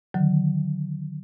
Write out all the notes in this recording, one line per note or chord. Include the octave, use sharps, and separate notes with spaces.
D3 D#3 F#3